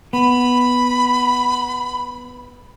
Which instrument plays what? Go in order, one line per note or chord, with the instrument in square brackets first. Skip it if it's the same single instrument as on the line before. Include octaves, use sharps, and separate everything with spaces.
[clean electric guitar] B3 [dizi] B5